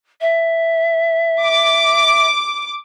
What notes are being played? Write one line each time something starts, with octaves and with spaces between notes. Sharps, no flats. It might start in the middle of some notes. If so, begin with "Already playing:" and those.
E5
D6